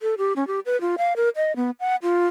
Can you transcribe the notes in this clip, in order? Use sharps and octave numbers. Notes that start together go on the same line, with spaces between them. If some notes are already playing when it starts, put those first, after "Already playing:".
A4
G4
C#4
G4
B4
F4
F5
A#4
D#5
B3
F#5
F4